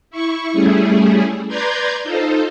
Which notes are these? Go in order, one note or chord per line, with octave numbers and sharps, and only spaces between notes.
E4 C#6
G3 A3 C#4 E4 G#4
B4 D5 A#5 C6 G6 G#6
D#4 F4 A4 C5